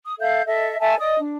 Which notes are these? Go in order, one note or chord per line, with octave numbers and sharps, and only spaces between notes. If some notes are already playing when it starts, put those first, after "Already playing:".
D#6
A4 E5 F5 G6
A4 D#5 E5
A4 E5 G#5 A5
D5 D#5 D#6
D4